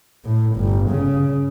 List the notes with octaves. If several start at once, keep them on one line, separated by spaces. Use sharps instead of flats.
A2
G1
C#3